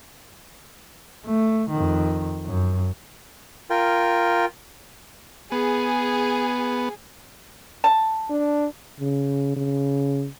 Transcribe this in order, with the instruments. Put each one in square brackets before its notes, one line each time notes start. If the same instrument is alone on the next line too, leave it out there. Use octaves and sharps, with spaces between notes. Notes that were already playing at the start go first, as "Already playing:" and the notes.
[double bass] A3
F2 D#3
F#2
[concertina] F4 A#4 G5
[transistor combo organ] B3 [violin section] G#4
[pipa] A5
[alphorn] D4
[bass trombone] C#3
C#3